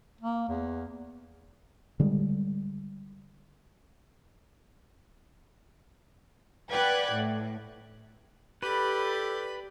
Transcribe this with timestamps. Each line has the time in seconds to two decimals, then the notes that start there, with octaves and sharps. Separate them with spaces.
0.21 A#3
0.49 E2
2.00 D3 G3 G#3
6.71 B4 D5 F#5 G5 F#6 G#6
7.14 A2
8.63 G4 A4 B4 D5 B5